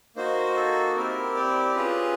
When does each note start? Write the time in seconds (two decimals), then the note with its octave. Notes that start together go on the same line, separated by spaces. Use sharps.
0.16 A#3 D#4 F#4 C5
0.56 A4
0.96 C4 E4 G4 A#4
1.35 D5
1.75 C#4 F4 G#4 B4